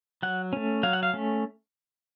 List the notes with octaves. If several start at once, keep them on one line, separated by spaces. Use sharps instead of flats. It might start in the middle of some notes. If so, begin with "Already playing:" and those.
F#3 F#5
A3 C#4
F#3 F5
F#5
F5
A3 C#4